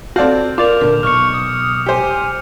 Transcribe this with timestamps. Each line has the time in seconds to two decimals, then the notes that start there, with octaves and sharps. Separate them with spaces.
0.16 C4 F#4 A4 D5 F5 G6
0.58 F4 A#4 D5 D6 F7
0.81 A#2 D3
1.03 B1 C#6 F6 C#7
1.33 D#6
1.86 G4 C5 G#5